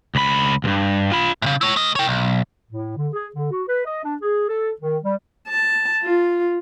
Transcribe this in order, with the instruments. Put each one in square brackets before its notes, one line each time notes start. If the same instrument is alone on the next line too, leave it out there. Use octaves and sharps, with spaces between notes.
[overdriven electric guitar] C#2 B5
C#2 G2
F4 B5
[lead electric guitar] A2 C#3
E4 C#5
A3 D#5
C#5 G5
B1
[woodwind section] A2
D3
G#4
D3
F#4
B4
D#5
D4
G#4
A4
D#3
G3
[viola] A5
F4